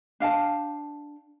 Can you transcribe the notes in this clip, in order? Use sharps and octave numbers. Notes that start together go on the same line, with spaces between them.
D4 F5 G5 A5